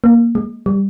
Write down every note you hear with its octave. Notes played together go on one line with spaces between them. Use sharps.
A#3
G#3
G3